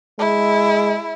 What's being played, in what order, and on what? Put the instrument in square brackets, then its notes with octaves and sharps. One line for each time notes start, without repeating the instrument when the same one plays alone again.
[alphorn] G#3 [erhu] E4